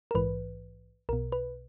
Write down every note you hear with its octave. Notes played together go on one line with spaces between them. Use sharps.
A#4
A#1 G#2 E3 B4
B1 B2 A#4
B4